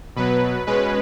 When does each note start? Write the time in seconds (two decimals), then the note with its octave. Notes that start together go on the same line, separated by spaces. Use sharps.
0.16 B2 F#3 B3 B4
0.67 B2 G#3 C#4 B4